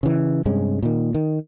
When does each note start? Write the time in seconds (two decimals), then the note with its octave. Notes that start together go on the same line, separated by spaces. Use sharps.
0.03 C#3 E3
0.45 G2 C3 G#3 C#4
0.83 A#2 D#3
1.15 D#3